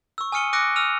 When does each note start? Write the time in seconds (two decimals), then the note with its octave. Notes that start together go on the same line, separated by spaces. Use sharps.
0.18 C#6 E6
0.32 G#5 D#6 F6 C#7 D#7 G7
0.53 D6 E6 F#6 A#6 C#7 D7
0.76 E6 F6 D#7 F7